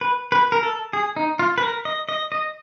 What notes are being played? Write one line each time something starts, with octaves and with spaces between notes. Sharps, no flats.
B4
B4
A#4
A4
G#4
D#4
F4
B4
A#4
D#5
D#5
D#5